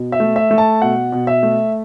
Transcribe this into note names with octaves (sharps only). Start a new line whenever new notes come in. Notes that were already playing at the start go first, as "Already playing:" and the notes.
Already playing: B2
E5
A3
E5
A3
A5
B2 F#5
B2
E5
A3